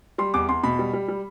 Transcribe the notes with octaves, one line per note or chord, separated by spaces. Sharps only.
G3 C6
E2 D6
E2 C6
B2 B5
G3
G3
G3